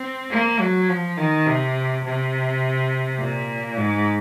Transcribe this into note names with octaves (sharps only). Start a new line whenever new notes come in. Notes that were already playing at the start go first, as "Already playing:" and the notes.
Already playing: C4
A#3
F#3
F3
D#3
C3
C3
A#2
G#2